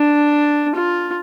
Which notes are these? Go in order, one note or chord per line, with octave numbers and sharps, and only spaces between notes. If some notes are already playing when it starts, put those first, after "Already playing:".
Already playing: D4
F4